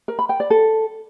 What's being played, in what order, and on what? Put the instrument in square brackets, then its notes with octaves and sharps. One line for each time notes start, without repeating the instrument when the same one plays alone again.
[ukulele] A#4
B5
G5
D5
A4